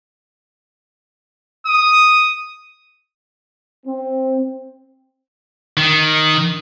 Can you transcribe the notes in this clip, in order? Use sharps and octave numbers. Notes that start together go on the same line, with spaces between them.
D#6
C4
D#3